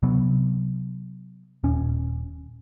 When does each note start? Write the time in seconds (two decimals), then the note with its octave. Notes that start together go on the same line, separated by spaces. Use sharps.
0.03 C3 F#3 B3
1.64 D#1 C#4